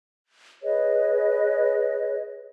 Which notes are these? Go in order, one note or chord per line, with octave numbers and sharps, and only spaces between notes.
G#4 B4 C#5 D#5